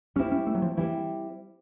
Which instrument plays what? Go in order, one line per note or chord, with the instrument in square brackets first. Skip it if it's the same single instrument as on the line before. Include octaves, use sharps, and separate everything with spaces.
[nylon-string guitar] G3 C4 E4 [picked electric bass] C#4
[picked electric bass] C#4
A3
F#3
F3
[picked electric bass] E3 [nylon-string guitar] G3 C4 E4